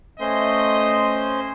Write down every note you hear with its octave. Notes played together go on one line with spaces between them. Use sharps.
A3 C#4 C5 D#5 C6